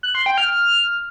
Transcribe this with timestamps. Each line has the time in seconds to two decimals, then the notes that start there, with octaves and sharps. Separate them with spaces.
0.03 F#6
0.15 C6
0.26 G5
0.38 F6